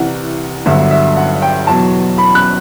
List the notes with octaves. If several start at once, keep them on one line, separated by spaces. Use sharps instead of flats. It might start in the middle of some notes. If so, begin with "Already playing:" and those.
Already playing: C2 C3 E3 F#5
G1 G2 D3 F#3 E5
E5
F#5
G5
E2 B2 F#3 A5
B5
F#6